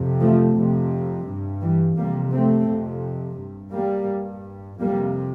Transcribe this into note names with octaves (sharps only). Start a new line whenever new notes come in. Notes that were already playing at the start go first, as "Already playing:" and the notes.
Already playing: F2 C3
F3 A3
F2 C3
G2
E3 G3
F2 C3 G3 A#3
A3 C4
F2 C3
G2
G3 A#3
G2
F2 C3 G3 A#3